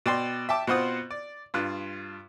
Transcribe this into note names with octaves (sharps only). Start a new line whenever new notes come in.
B2 D5 G5 C6
E5 G5 A5 D6
B2 C4 F4 C5 F#5 D#6
D5
G2 F4 F#6